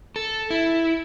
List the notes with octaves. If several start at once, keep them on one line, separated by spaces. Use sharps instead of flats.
A4
E4